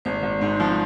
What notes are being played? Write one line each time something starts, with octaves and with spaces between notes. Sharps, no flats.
G#1 C5
G#1
G#2
F3